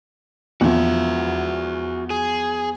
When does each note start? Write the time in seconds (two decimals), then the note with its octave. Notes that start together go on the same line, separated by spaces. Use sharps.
0.61 E2 F3 F#4 E5
2.10 G#4